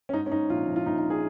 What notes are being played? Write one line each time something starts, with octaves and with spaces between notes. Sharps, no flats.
C#4
G#2 D#4
C#4
G#2 D#4
A#1 F4
A#1
F4
A#1 D#4
D#4
G#4